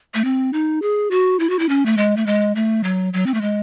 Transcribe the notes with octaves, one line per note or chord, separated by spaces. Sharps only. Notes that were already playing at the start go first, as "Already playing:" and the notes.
A3
C4
D#4
G#4
F#4
E4
F#4
E4
C#4
A3
G#3
A3
G#3
A3
F#3
F#3
C4
A3
G#3